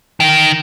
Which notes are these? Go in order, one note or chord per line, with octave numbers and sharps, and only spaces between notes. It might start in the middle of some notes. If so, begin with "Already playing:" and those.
D#3